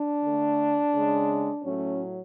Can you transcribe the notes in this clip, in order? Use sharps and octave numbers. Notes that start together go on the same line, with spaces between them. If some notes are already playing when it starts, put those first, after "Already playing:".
Already playing: D4
D3 A3
C#3 G#3
A2 F#3 A3 C#4